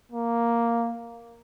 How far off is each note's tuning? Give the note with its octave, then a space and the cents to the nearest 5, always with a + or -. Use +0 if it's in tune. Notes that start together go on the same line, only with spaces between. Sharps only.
A#3 +0